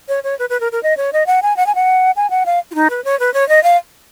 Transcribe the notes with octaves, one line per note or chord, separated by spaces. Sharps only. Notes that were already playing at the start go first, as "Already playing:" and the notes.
C#5
C#5
B4
B4
A#4
A#4
D#5
C#5
D#5
F#5
G#5
F#5
G#5
F#5
G#5
F#5
F5
F4
D#4
B4
C#5
B4
C#5
D#5
F5